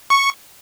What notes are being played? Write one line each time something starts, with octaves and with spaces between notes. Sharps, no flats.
C#6